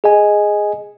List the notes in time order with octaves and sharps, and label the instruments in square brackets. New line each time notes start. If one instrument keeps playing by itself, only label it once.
[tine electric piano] G#4 D#5 G#5